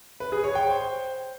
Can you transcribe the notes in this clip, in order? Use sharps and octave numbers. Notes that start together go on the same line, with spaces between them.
B4
G#4
C#5
G5
C5